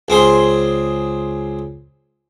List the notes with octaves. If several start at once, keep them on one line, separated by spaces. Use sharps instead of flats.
C#2 C4 G#4 C6